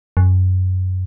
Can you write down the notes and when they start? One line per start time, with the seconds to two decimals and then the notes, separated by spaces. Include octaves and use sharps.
0.17 F#2